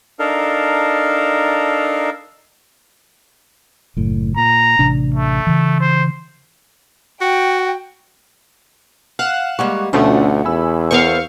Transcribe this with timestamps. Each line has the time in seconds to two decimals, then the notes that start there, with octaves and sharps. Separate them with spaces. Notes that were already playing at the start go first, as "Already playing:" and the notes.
0.19 D4 D#4 A4 A#4 F5
3.97 F#1 A2
4.37 A#2 A#5
4.79 A1 C3 D4
5.14 A3
5.47 C#3 E3
5.80 C5
7.21 F#4 G5
9.19 F5 F#5 F#6 E7
9.59 G3 G#3 A#3 F#5 C#6
9.93 D2 B2 F3 A3 C#4 D4 A4 F#5
10.45 E2 G#5 B5 E6
10.91 B3 A#4 C5 F5 C#6